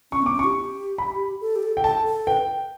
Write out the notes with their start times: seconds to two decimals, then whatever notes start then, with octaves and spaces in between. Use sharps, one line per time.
0.12 C#4 C#6
0.22 B3 D6
0.34 C#4
0.39 G4 C#6
0.98 B5
1.41 A4
1.56 G4
1.63 A4
1.77 G5
1.84 A4 A5
2.06 A4
2.27 B4 G5